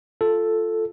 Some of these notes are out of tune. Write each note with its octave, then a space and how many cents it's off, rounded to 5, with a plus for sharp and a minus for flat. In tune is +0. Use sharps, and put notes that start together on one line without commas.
F4 +0 A4 +0